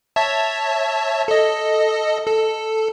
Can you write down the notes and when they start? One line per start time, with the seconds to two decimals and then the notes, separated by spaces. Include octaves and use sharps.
0.16 C#5 E5 A5
1.28 A4 D#5
2.26 A4